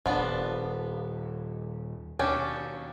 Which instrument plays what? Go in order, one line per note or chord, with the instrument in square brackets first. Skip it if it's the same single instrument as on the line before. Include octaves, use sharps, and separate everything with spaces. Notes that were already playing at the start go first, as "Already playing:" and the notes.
[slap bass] D#1 [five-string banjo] F3 B3 D4
[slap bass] D#2 B2 [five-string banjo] C#4 D4 G4